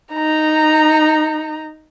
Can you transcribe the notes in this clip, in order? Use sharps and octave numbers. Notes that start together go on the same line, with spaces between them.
D#4 A#5